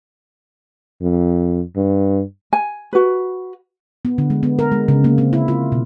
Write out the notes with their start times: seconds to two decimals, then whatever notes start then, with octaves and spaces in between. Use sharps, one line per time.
1.02 F2
1.76 G2
2.53 G#5
2.93 F#4 B4
4.05 B3
4.18 D3
4.30 G#3
4.43 B3
4.59 A#4
4.72 G#3
4.88 C#3
5.04 A#3
5.18 C4
5.33 E4
5.48 F4
5.72 B2